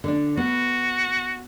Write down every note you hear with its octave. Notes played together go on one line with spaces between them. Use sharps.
D3 D4
B3 F#4